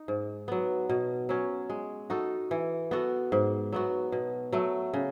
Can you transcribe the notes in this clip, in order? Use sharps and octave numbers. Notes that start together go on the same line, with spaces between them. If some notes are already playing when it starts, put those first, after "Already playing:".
Already playing: D#4
G#2
F#3 B3
B2
F#3 C#4
G#3
D#4 F#4 A4
E3
B3 F#4 A4
G#2
F#3 B3 F#4
B2
F#3 A3
C#3